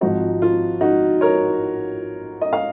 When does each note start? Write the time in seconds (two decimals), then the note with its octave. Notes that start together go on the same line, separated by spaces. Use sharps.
0.01 G#1 G#2 F3 C4 D#4 F#4
0.42 F4
0.81 D#4 F#4
1.21 A#4 C#5
2.41 D#5
2.53 F5